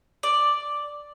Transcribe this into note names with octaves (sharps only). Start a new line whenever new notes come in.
D5